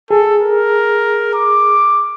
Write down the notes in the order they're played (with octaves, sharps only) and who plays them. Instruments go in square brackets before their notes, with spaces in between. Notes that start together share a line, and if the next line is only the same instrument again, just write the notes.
[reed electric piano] G#4 [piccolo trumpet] A4
[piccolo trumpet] A#4
D6